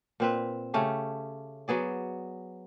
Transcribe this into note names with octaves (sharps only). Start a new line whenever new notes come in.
A#2 C4 B4
C#3 A3 C#4 G4
F#3 B3 G#4 D5